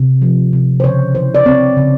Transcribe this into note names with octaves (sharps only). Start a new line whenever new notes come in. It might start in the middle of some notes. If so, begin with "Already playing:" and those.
Already playing: C3
F3
C3
C5
C#3 C#5
E3 C5
D5
C4 C#5
C#3